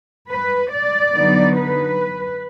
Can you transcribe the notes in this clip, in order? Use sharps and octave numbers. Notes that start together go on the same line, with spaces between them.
B4
D5
D3 F#3 B3 D#4
B4